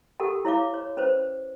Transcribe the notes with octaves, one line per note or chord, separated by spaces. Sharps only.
G4 A4 A#4 F#5 G5
E4 C#5 F5 D6
C#5
C#4 B4 C5